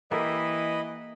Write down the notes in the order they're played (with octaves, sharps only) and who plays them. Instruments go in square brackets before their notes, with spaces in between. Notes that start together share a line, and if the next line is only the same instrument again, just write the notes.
[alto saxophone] E3 [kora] A#3 G4 A4 [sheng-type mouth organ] D#5 B5